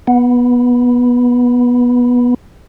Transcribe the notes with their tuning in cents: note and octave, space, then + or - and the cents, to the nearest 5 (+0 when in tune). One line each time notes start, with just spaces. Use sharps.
B3 -15